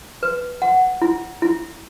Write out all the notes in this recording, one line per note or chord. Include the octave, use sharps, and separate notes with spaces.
B4
F#5
E4
E4